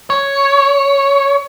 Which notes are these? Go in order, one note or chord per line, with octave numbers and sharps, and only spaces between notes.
C#5